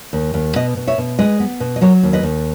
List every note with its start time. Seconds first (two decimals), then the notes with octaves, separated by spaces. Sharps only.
0.13 D#2
0.34 D#2
0.56 B2 B4 D#5
0.77 B2
0.87 C#5 E5
0.98 B2
1.19 G#3 B4 D#5
1.40 B3
1.60 B2
1.76 D#5
1.81 F#3 A#4 C#5
2.03 D#2
2.13 B4 D#5
2.23 D#2